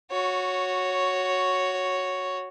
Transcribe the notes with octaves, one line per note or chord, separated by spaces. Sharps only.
F#4 C#5